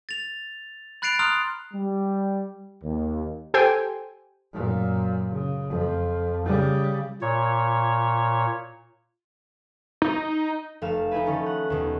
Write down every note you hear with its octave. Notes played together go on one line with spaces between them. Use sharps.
A6 F7
B5 F#6 A6 C7 D7 F7
A#5 C6 D#6 F6 F#6 F7
G3
D#2
G4 A4 C5 G5 G#5
F#2 A#2
C#3
F2
C#3 G3
A#2 C#5
D#4
F1 A3 F5 E7
D#4 E4 G#4 B4
D#3 C#4 A4
F#5
D#2 B2 D#4